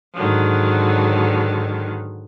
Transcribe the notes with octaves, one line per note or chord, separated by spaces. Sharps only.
G#2 D3 D#3 F#3